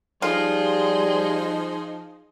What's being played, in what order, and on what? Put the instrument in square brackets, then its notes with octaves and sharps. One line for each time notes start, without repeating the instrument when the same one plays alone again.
[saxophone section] F3 D#4 [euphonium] G3 [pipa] F4 [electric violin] G#4 C6